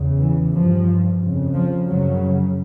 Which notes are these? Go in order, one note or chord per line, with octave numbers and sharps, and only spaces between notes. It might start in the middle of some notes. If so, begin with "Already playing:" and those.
Already playing: E2 C#3
E3
G2 F3
F2 C#3
F3
F#2 C#3 F#3